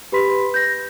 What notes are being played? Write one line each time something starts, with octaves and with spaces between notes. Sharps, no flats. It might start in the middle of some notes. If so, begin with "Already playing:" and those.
G4 B4 B5 C6 B6
G6 A#6